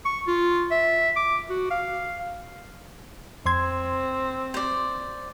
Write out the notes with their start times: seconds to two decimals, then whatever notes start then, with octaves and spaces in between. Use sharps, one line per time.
0.05 C#6
0.28 F4
0.71 E5
1.16 D6
1.50 F#4
1.71 F5
3.46 F2 C4 C6 G#6
4.54 C5 D5